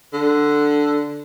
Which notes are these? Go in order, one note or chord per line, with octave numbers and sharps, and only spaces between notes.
D3